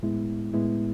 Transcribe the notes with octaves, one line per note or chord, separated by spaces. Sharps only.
A2 G#3 B3 E4
A2 G#3 B3 E4